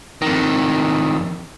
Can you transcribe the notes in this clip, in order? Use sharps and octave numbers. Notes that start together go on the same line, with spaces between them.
F2 D#3